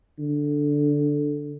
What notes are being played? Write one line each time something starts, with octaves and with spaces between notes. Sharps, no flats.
D3